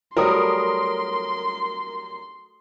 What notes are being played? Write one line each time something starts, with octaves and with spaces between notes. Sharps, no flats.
F#3 G3 A3 A#4 C6 D#6